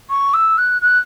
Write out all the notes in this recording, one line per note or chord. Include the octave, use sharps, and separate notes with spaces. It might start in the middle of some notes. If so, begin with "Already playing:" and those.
C#6
E6
F#6
F#6